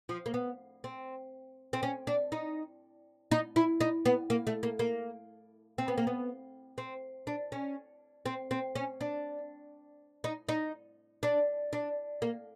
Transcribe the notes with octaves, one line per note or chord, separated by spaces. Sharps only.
F3
A#3
B3
C4
C4
C#4
D4
D#4
D#4
E4
D#4
B3
A#3
A3
A#3
A#3
C4
B3
A#3
B3
C4
D4
C#4
C4
C4
C#4
D4
D#4
D#4
D4
D4
A#3